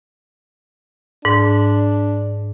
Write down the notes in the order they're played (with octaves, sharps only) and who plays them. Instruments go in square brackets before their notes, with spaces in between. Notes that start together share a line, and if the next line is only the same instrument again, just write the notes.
[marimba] G#2 [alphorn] D4